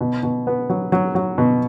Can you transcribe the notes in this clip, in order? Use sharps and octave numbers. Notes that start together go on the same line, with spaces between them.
B2
B2
B3
F#3
F#3
F#3
B2